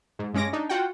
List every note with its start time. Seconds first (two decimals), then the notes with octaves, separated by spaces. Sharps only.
0.19 G#2
0.34 G2 G#3 C#4 D6 A#6
0.53 D4 D#4
0.69 F4 F#4 F#5 G5